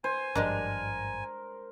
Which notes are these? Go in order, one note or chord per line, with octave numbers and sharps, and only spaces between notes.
C5 G#5
G#1 G2 F3 G3 G#3 D4 A#4